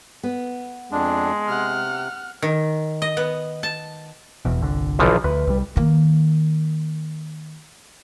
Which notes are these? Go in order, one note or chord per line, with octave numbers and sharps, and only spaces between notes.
B3
F2 G#3 D4
C3 F#5 F6
D#3
D#5
B3
A5
F1 E2 B2
G1 C2 D3
B1 E3 F3
D2 B4
C2 G3
D#3 A#3